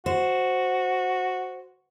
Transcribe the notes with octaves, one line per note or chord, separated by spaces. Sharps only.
F#4 C5